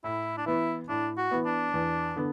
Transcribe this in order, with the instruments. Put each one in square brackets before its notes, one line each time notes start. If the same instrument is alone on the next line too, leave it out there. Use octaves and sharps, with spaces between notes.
[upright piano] A2 [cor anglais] E4
[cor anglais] D4
[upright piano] E3 B3 [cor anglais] E4
[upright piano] A2 [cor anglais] D4
[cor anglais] F#4
[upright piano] E3 B3
[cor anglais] D4
[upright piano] E2
D3 B3